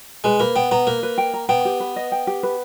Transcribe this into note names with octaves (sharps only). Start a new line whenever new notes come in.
G#3 B4
A#3 B4
B3 G5
B3 A#5
A#3 B4
B4
G5
A#5
B3 G5
G4
B4
D#5
G5
G4
B4